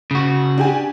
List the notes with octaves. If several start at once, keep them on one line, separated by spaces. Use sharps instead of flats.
C#3 F#4
D4 G4 G#5